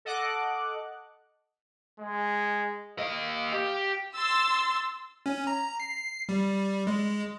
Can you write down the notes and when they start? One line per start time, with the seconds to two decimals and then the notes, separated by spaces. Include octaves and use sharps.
0.05 A4 D#5 F#5 D6 F#6
1.99 G#3
2.99 A#3 D#5 F5
3.52 G4
4.16 C6 E6 A6
5.26 C#4
5.47 A#5
5.80 C7
6.29 G3
6.87 G#3